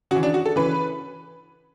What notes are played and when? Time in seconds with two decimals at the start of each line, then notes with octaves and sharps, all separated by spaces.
0.11 C#3 F#4
0.15 E3
0.23 D4
0.34 F#4
0.46 A4
0.56 C#3 E3 B4